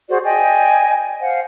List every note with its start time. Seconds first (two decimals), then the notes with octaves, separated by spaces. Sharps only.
0.09 F#4 G#4 C5 D5
0.23 D5 D#5 G5 G#5
1.21 C5 F5 F#5